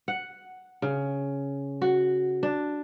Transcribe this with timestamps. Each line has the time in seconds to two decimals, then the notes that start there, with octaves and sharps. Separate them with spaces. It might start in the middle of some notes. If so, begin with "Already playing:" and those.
0.08 F#5
0.82 C#3
1.82 F#4
2.43 D4